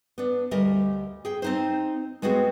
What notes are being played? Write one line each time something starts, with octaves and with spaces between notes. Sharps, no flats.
B3 D4
D2 G3 A#4 D#5
G#4 G5
C4 D#4 C5
G#3 B3 C4 F#4 G#4